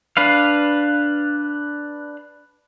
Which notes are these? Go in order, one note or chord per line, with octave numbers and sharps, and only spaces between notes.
D4 B4 F5